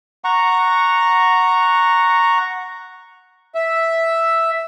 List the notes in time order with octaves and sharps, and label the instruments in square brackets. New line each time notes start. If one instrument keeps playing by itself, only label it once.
[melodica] F#5 A#5 C#6
[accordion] E5